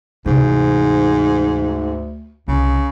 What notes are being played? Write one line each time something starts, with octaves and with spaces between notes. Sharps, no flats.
D2 G#2 C3 E3
C2 C#3